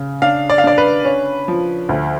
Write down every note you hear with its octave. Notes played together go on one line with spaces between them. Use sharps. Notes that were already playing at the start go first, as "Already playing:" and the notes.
Already playing: C#3
D4 F5
D5
F5
D4 D5
B4
C#4
F3
D2